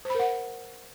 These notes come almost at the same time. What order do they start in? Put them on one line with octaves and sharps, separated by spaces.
C5 B5 A#4 F#5